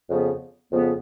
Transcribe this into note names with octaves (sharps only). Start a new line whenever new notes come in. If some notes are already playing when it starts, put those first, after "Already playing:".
F2 C#3 F3 B3
F2 C#3 F3 B3